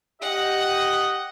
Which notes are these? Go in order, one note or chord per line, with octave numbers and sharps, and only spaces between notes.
G4 D#5 F#5